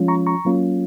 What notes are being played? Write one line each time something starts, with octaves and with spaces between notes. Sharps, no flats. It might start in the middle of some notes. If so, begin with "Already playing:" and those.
Already playing: F3 G#3 C#4 F4
A#5 C#6
A#5 C#6
F#3 A#3 C#4 F4